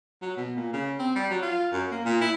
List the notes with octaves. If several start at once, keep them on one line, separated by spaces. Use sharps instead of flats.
F#3
B2
A#2
C#3
C4
G3
F#3
F4
F#2
A#3
A#2
E4